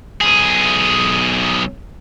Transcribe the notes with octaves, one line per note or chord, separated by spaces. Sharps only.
B1 G#4